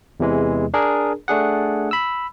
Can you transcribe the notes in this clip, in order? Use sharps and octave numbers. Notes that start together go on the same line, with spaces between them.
E2 C3 E3 G#3
D4 G#4 A#4
A3 D4 G#4 F#5
B5 E6